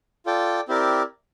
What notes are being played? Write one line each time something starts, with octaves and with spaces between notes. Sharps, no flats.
F4 A4 D5 G5
C4 E4 G4 A#4 D5